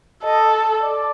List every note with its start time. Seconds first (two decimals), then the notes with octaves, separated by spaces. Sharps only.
0.24 A4 D#5
0.82 D5